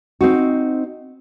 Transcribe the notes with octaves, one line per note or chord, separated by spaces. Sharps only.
C4 D#4 F#4